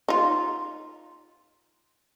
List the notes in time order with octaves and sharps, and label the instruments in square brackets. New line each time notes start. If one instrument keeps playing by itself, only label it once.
[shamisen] D#4 F4